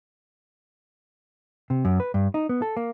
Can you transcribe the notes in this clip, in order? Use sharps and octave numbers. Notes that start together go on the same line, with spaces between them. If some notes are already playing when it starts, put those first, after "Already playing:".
C3
F#2
B4
G2
D#4
B3
A4
A#3